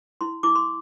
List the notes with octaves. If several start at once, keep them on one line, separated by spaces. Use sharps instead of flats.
E4 C6
E4 D6
C6